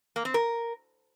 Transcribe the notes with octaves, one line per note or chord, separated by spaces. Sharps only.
A#3
C4
A#4